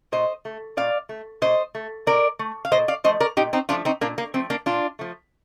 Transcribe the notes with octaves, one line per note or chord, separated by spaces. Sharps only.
A#2 C5 D#5
A3
A#2 D5 F5
A3
A#2 C5 D#5
A3
A#2 A#4 D5
A3
F5
A#2 C5 D#5
D5 F5
F3 A3 C5 D#5
A#4 D5
A#2 D#4 G4
C4 D#4
F3 A3 D4 F4
C4 D#4
A#2 A#3 D4
A#3
F3 A3 C4
A#3 D4
A#2 D4 F4
F3 A3